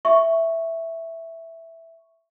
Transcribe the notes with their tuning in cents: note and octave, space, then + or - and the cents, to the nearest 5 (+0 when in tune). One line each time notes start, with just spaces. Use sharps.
E5 +0 C#6 +0